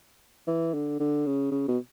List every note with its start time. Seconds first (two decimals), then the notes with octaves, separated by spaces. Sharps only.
0.47 E3
0.74 D3
1.00 D3
1.26 C#3
1.51 C#3
1.68 B2